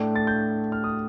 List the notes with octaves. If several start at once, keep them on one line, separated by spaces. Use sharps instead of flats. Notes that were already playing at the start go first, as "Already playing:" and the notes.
Already playing: A2 A3 D4
A6
G6
F6
D#6